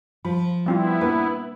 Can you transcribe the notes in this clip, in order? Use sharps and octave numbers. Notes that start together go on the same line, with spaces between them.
F3 B5
G3 B3 C4 E4 F4
A#3 D4 B4